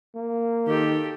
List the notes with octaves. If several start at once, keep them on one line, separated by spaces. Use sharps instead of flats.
A#3
D#3 G4 A4